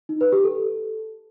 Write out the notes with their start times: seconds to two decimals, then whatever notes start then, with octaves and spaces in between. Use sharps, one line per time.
0.09 D#4
0.21 B4
0.32 G4
0.44 A4